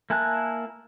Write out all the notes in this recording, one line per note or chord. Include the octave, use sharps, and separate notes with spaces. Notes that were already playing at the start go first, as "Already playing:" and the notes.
A#3 E4 G#5 A5 F#6